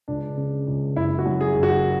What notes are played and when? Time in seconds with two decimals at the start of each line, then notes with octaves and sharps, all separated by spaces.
0.08 C#2 D4
0.37 C#3
0.67 C#2
0.96 F#1 E4
1.19 F#4
1.26 F#2
1.41 G#4
1.56 F#1
1.63 F#4